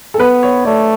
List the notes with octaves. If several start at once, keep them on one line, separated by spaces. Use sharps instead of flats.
A4
B3 B4
C#5
A3 D5